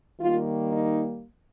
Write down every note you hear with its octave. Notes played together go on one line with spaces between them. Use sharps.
D#3 G3 A#3 F4
D#4